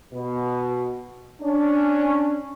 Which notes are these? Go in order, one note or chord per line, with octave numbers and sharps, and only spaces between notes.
B2
C#4 D4